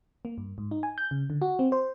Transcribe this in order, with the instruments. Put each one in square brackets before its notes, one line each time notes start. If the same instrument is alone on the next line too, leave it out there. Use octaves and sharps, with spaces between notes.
[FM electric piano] A#3
G2
G#2
D#4
G#5
G6
C#3
D3
F#4
C4
C5